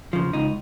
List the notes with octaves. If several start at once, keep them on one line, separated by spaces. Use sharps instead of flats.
C#3 F3
C#2 D#4